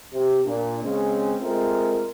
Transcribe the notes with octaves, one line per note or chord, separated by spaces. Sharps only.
C3
A#2 D4
C#3 G#3 C4 C#4
G#3 A3 C4 F4 A#4